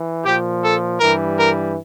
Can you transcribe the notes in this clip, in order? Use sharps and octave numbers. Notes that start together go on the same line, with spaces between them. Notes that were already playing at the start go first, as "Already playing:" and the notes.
Already playing: E3
A#2 F3 G4
A4
G2 E3 G3 A#4
A#4